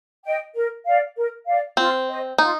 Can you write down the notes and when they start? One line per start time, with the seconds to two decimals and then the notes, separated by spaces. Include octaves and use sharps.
0.25 D#5 G5
0.54 A#4
0.85 D5 F5
1.16 A#4
1.47 D5 F5
1.77 C4 F4
2.08 C5 D#5
2.38 D#4 F4